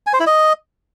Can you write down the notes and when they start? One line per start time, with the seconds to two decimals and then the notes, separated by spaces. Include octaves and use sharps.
0.07 G#5
0.13 C5
0.20 E4
0.27 D#5